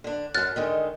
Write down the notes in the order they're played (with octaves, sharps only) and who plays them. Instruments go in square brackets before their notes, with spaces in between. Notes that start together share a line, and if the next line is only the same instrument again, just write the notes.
[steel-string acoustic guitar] D3 D4
[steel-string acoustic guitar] F#2 F#3 [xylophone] F6 F#6 A6
[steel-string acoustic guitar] D3 D#3 G#3